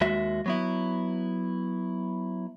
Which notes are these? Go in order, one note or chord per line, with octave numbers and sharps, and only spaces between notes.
D#2 G#3 F#4 E5
F#3 B3 E4